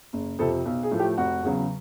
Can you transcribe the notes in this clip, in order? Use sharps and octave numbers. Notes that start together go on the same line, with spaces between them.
F#1
F2 C3 A4
B1
G#4
A2 F3 A3
G4
F1 F#4
E2 C#3 F#3